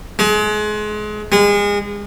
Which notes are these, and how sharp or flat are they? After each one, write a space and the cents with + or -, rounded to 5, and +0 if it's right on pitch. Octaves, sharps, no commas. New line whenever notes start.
G#3 +30
G#3 -30